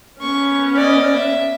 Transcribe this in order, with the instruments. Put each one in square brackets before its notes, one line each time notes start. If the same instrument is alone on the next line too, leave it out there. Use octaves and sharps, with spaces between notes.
[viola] B3 C#4 [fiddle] C#6
[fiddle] D5 D#5
E5